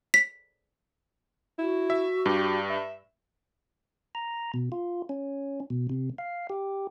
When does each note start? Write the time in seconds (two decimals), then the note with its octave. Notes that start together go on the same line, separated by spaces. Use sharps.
0.14 B6
1.59 E4 F#4
1.90 E5
2.26 G2 G4
2.70 E5
4.15 A#5
4.54 B2
4.72 F4
5.09 C#4
5.70 B2
5.89 C3
6.18 F5
6.50 G4